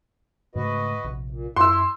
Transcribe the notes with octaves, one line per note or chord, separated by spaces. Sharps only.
G#2 C#3 A3 F#4 B4 D#5
A#1 C3
A#2
F#2 E4 C6 E6